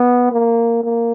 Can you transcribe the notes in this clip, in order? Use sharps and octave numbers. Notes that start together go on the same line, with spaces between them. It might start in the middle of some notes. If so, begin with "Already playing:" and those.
Already playing: B3
A#3
A#3